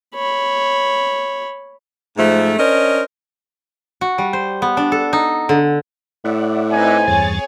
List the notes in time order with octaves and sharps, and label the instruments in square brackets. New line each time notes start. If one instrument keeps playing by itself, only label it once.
[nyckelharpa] C#5 B5
[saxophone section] G#2 F3 A3
C#4 D4 A#4 C5 D#5
[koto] F#4
G3
C5
B3
D4
A4
D#4
D3
[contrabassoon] A2 [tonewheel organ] D5 E5 F#5
[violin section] C4 D#4 B4 [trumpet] G#5
[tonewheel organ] E2 G2 A6 [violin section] G#4 C#5